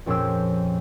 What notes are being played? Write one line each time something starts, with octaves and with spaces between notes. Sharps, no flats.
F2 A#2 C#4 G#4 G5 E6